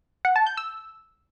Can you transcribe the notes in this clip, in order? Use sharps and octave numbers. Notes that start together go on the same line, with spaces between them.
F#5
A5
G6
E6